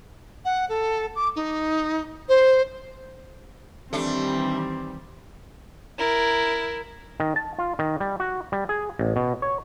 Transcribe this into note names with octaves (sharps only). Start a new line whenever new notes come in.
F#5
A4
D6
D#4
C5
D#3 E3 G3 A3 C4 D4
E4 A#4
D#3
A5
F4
D#3
G3
F#4
G3
G#4
A1
B2
C#5